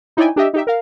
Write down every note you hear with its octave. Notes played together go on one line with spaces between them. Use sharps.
D#4 E4 C#5 D5 G5 G#5
D4 G4 D#5 E5
D#4 G4 E5
A#4 F5